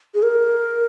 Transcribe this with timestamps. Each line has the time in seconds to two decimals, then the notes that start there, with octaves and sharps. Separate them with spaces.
0.14 G#4
0.23 A#4